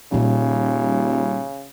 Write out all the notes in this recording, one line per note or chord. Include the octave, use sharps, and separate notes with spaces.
D#1 A#2 C#3 G3